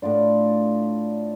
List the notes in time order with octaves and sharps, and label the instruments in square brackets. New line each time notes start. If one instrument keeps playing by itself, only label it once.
[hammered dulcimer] A2 D4 F4 D5